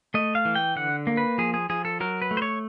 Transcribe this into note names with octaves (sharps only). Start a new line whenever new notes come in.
A3 D#5
F5
E3
G5
D3 F#5
A#3
B4
F3 G#4
G#4
F3 G#4
A4
F#3 A#4
B4
A3
C5
C#5